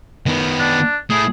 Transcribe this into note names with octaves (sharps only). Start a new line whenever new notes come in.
D#3 B3
D4
A3 E4 G#4